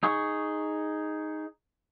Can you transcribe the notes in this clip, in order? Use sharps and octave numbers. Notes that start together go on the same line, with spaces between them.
D#4 G#4 C#6